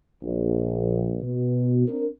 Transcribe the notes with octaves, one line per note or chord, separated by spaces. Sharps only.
A#1
B2
C4 D4 A#4